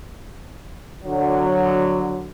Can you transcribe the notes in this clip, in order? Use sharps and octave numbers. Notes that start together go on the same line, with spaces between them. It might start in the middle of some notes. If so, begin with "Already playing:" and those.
D3 F#3